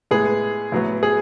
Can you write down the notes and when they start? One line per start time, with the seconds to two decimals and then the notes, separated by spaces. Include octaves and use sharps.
0.11 A2 G#3 B3 G#4
0.72 A2 F#3 B3
1.03 G#4